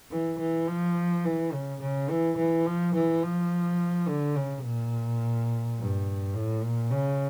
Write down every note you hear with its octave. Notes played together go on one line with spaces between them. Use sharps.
E3
E3
F3
E3
C#3
C#3
E3
E3
F3
E3
F3
D3
C#3
A#2
G2
A2
A#2
C#3